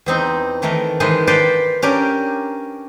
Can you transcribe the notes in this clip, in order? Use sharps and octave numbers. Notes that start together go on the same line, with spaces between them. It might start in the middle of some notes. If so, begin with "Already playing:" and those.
E2 C4 D#4
D#3 E3 A3 A#4
D#3 E3 G#3 C5
B4 C5 D5 F5 G5 A5
C#4 D4 G4 A#4 D5